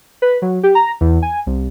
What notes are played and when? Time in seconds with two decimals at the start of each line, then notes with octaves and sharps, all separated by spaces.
0.22 B4
0.42 F#3
0.63 G4
0.75 A#5
1.01 E2
1.22 G#5
1.47 C2